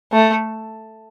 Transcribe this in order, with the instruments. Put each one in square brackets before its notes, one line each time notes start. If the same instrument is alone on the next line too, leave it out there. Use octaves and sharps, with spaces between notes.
[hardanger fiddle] A3